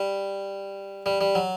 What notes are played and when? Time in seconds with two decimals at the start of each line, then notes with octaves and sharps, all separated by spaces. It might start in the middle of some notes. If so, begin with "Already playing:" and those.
Already playing: G3
1.06 G3
1.21 G3
1.35 F#3